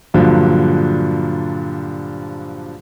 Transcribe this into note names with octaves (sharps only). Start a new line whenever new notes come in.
G2 A#2 D3 F3 F#3